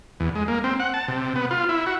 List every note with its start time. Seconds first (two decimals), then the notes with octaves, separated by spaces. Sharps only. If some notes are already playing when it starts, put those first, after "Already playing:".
0.20 E2
0.35 G#3
0.48 A#3
0.64 C4
0.80 F#5
0.94 A5
1.08 C3
1.36 B3
1.51 F4
1.69 E4
1.86 F#4